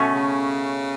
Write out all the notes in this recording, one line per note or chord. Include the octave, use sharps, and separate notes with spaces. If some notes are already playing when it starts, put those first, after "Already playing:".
Already playing: B2 A3 C#4
C#3